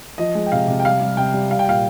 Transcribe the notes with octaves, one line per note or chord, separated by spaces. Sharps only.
F3 D#5
G#3
G5
C3 F5
C3
G5
G3 F5
G3
C3 G5
G3
G3 F5
G5
A#2 F5